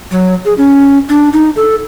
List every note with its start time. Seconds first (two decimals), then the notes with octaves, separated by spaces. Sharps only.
0.11 F#3
0.45 G#4
0.58 C#4
1.09 D4
1.33 D#4
1.56 A4